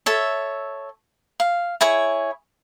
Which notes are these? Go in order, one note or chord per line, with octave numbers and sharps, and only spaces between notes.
A4 C#5 E5
F5
E4 G#4 C#5